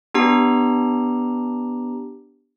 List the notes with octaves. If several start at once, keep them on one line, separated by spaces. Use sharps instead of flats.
B3 D4 G4 A#5